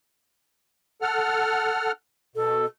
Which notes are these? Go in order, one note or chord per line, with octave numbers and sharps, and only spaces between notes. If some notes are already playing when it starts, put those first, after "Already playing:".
A4 F#5 F6
B2 A4